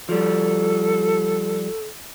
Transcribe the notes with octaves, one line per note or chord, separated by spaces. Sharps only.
F3 G3 A4